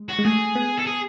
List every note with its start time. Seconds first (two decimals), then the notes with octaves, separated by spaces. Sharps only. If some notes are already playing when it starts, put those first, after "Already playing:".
Already playing: G#3
0.09 F#4
0.19 G#3
0.25 A3 G#4
0.55 B3
0.79 A4
0.87 G#4